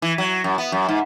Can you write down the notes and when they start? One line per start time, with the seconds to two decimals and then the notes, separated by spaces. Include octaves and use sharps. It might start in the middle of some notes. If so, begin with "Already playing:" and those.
0.02 E3
0.18 F#3
0.44 F#2
0.58 B3
0.72 F#2
0.89 G#2